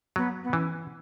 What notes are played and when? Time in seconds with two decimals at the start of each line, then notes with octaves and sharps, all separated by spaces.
0.16 F#3 B3
0.43 B3
0.53 E3 C#4